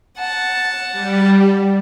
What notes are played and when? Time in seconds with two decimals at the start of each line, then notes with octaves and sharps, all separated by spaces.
0.19 F#5 A5
0.92 G3